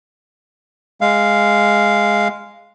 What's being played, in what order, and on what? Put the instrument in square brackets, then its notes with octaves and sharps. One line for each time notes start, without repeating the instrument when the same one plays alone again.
[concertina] G#3 F5